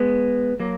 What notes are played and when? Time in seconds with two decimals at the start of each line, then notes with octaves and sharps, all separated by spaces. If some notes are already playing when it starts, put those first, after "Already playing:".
Already playing: G#3 B3
0.60 F#3 A#3